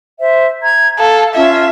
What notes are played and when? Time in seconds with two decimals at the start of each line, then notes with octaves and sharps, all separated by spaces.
0.20 C5 E5
0.62 A#5 G#6
0.98 A4 F5
1.35 C#4 F4 E5